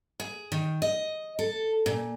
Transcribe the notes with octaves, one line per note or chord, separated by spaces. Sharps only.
G#4
D#3
D#5
A4
A#2